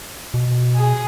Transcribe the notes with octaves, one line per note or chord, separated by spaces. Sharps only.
B2
G#4